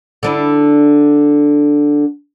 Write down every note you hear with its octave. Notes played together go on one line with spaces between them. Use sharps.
D3 D4 E4